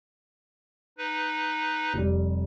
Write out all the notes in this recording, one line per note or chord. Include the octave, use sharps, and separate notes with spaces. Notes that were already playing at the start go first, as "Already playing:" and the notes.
D#4 B4
F1 G3